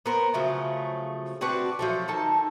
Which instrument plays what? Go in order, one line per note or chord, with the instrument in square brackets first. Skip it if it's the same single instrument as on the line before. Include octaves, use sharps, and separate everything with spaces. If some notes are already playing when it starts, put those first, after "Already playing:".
[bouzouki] B3 A#4 C5
C#3 F3 F#3 A3
C4 D4 F#4 B4
F3 F#3 A3
D#3 D#4 A4 A5